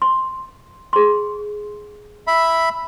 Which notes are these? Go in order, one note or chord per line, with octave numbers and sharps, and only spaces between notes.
C6
G#4 C6
E5 B5